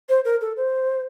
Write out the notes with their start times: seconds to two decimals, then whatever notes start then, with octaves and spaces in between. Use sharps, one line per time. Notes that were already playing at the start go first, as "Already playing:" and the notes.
0.09 C5
0.25 A#4
0.41 A4
0.57 C5